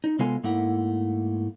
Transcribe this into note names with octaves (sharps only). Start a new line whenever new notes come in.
D#4
C3 G#3 B3 F4 A4 G#5
G#2 A3 A#3 E4 F#5